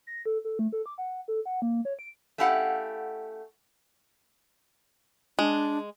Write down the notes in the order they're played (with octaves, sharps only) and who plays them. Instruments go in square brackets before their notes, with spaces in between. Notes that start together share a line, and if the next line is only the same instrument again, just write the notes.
[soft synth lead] A#6
A4
A4
A3
A4
D6
F#5
A4
F#5
A#3
C#5
D7
[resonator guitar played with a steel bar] A3 C#4 E4 G4 F5 F#5
[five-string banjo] G#3 [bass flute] D4